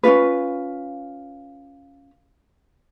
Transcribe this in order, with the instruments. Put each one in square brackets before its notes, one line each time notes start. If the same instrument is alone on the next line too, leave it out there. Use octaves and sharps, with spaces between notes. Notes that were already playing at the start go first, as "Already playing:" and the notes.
[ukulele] C#4 D#4 F4 B4